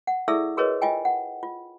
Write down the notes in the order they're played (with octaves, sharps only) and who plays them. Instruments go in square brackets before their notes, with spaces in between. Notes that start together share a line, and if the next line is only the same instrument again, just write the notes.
[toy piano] F#5
E4 G#4 A4 D5 E5 E6
F#4 G#4 A#4 B4 C#5 D#5
F4 D#5 G5 G#5
F#5
F4